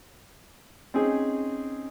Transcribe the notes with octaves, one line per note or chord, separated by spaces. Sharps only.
C4 C#4 D#4 G#4 C5